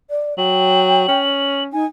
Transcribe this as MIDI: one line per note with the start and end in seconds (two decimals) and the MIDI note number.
0.10 0.34 74
0.38 1.05 54
0.38 1.22 79
0.38 1.64 102
1.08 1.71 61
1.73 1.84 63
1.73 1.87 80